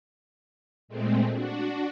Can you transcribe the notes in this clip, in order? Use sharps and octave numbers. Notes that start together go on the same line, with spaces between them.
A#2 G#3 A3 C4
D4 F#4